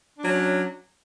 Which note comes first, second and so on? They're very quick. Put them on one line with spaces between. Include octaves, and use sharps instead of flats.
D4 F#3 C#4